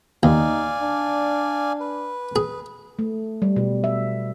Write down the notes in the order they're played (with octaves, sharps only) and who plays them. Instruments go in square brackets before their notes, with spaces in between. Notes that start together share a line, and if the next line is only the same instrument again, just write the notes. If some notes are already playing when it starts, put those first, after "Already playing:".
[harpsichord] D#2 [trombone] D#4 [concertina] D5 F5 G#5
[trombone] D4
[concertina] B4
[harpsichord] G#4
[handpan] A3
G3
B2
E5